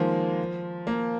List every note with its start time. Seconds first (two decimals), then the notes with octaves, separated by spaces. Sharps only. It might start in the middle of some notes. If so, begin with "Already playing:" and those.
Already playing: D#3 F3 G#3 A#3
0.87 A#3